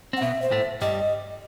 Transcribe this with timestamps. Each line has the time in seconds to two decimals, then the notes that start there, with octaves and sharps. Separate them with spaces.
0.13 C4 F#5
0.22 B2 B3 E5
0.42 C5
0.51 A2 A3
0.81 G2 G3 D#5